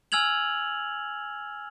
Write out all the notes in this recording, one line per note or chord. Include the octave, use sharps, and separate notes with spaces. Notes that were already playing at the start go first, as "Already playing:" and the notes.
G#5 E6 F6 G#6 F7 F#7